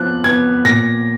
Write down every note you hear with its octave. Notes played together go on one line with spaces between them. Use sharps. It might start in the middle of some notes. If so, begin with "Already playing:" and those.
Already playing: F3 B3 F#6
B3 G#6
A#2 A#6